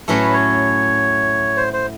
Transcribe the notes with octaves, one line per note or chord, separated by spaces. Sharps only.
A2 F#3 A3 C#4 F#4 B4
C#5
C5
C5